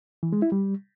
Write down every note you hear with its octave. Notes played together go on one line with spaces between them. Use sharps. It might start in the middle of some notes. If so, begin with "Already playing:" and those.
E3
G#3
E4
G3